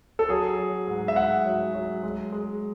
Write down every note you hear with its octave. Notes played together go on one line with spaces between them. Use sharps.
A4
F#3 G#4
F#3
G#2
E5
G#2 F#5
F#3
F#3
G#3
G#3